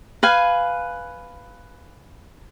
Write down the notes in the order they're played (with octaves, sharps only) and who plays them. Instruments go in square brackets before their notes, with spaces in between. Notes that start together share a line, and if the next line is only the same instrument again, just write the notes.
[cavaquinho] B4 F5 G#5